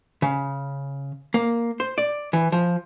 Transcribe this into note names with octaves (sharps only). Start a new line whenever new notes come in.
C#3
A#3
C5
D5
E3
F3